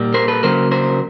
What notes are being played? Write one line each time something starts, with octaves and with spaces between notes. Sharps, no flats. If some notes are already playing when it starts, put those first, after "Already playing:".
Already playing: A#2 G3 A#3
A#4 C5
A4 B4
C#3 F#3 A#3 A#4 C5
A#4 C5